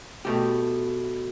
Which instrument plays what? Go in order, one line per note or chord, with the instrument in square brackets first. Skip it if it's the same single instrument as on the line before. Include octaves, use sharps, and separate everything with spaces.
[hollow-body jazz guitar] B2 A3 G4